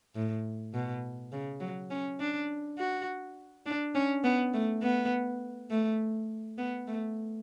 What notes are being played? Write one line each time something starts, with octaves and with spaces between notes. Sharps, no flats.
A2
B2
C#3
F#3
C#4
D4
F#4
D4
C#4
B3
A3
B3
A3
B3
A3